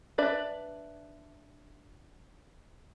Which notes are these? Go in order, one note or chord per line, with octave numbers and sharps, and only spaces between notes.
D4 B4 D5 E5